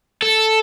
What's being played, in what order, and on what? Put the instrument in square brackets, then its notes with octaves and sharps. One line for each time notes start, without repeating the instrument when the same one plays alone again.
[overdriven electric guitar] A4